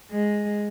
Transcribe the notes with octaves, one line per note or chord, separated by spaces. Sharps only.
G#3